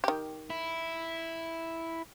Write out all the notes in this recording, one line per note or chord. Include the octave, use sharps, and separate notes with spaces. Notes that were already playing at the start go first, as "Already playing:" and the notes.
D#3 G4
E4